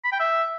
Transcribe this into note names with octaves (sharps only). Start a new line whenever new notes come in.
B5
G5
E5